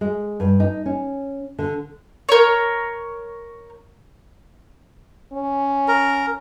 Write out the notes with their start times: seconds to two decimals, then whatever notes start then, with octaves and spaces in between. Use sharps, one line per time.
0.01 G#3
0.40 G2
0.60 D#4
0.86 C#4
1.58 D3
2.29 A#4 C#5
5.33 C#4
5.88 A#4